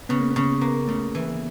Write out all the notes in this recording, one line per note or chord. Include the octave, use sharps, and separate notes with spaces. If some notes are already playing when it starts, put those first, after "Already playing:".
C#3 B3
A#3
B3
C#3
A#3 B3
C#3 A3
E3